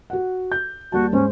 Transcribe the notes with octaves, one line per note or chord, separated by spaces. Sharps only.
F#4 F#5
G6
D#2 G3 F#4 A5
G#2 C#4 C5